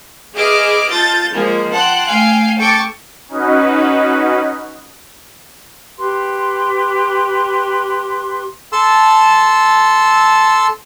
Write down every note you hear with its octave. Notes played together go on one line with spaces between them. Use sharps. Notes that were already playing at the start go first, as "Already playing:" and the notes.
G#4 B4 D#5 E5 D6 F6
F4 A4 G6 A6
F3 G#3 A#3
F#5 G5 A5 C6 F#6
A3 F5 G5 G#5
A4 G5 C#6 D6 A6
C#4 D#4 F#4 B4
G4 B4 C6
A4 A5 C6 E6